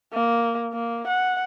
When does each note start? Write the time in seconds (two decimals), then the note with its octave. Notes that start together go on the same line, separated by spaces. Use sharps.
0.14 A#3
0.73 A#3
1.08 F#5